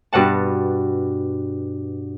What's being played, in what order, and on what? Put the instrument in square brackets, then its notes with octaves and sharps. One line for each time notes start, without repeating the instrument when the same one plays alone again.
[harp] G2 B2 F#5 A5